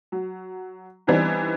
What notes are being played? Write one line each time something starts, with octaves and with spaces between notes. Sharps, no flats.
F#3
E3 G3 B3 C4 D4 D#4